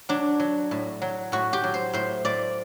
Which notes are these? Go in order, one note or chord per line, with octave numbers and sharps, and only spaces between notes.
F#3 D4
F#3
A2
F#3
A2 F#4
G4
F#3
C5
A2 C5
A2 D5